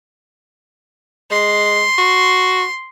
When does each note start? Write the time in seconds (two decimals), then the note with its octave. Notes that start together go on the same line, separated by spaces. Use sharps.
1.31 G#3 C6
1.98 F#4